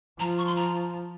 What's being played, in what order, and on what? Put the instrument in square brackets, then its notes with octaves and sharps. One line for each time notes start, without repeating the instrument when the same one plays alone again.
[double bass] F3 [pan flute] A#5
[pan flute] C#6
C6
A#5